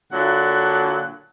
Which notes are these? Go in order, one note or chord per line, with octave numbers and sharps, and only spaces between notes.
A#2 D3 F#3 F#5